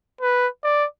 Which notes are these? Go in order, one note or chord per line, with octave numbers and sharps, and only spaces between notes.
B4
D5